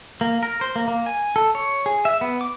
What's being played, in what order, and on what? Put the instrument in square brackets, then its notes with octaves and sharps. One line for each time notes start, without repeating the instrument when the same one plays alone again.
[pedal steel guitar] A#3
A#4
C5
A#3
A#3
G#5
A4
C#5
G#4
E5
B3
D6